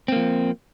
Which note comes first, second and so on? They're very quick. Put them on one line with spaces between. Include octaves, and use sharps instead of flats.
C4 A#3 F3